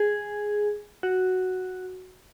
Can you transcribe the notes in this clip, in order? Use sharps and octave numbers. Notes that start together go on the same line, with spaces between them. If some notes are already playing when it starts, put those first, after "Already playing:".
Already playing: G#4
F#4